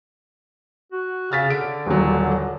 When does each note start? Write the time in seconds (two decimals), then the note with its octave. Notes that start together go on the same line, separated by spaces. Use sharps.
0.92 F#4
1.32 C#3 F6 A6 B6
1.50 D3 D7
1.86 D#1 F#3